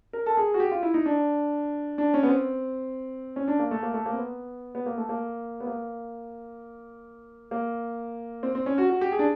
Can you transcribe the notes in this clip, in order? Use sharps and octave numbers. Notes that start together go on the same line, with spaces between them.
A#4
A4
G#4
F#4
G4
F4
E4
D#4
D4
D4
C#4
B3
C4
C#4
D4
A#3
A3
A#3
A3
A#3
C4
B3
B3
A#3
A3
A#3
B3
A#3
A#3
C4
C4
C#4
F#4
F#4
G4
G#4
D4